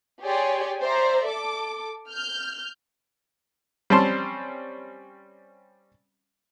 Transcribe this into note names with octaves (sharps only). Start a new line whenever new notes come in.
G4 G#4 C#5 D5 G#5 C6
C5 D5 E5 A#5
A4 D6
F6 G6
G3 C4 C#4 A5 C6